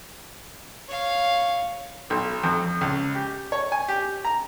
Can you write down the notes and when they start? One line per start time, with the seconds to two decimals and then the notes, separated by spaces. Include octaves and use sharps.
0.88 C#5 F5
2.10 B1
2.43 F2
2.81 C#2
3.15 G4
3.52 C#5
3.72 G#5
3.88 G4
4.25 A#5